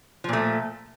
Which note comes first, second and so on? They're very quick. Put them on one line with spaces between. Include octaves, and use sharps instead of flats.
F3 A#2 A3